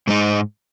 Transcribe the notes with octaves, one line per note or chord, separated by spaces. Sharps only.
G#2 G#3 D#4